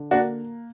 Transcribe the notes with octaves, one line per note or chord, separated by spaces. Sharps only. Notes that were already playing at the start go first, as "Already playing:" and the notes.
Already playing: D3
A#3 D4 F#4